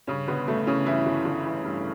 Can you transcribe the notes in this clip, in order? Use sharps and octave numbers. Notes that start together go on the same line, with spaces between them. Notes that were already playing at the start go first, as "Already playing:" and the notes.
G2 C#3 C#4
G1 B3
G1 A3
C#3 E3 C#4
G2 E3 E4
G1
G1
E3
G2